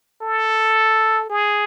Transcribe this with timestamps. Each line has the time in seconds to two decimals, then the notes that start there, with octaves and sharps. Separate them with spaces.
0.22 A4
1.30 G#4